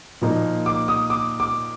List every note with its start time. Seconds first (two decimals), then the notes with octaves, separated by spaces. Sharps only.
0.21 A#2 F3 A#3 D#4
0.66 D6
0.88 D#6
1.10 D6
1.40 D6